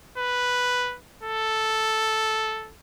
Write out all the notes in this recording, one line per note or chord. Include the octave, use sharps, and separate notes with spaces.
B4
A4